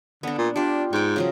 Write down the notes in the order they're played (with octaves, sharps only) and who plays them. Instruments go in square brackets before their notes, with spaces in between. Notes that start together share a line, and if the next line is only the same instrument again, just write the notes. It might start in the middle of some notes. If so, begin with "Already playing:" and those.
[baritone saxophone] D3 [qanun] B3 D4
[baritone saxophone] A#2
[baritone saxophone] D4 [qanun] F4 G4
[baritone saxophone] G#2 [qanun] G5 C#6
[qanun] C#3 F3 F#3